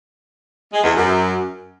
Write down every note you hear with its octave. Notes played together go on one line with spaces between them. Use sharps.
G#3
E2
F#2